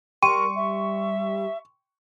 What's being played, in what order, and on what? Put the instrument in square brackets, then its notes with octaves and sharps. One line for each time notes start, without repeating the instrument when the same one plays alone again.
[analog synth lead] G3 [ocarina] A#4 [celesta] G5 C6 D#7 [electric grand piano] C#6
[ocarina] E5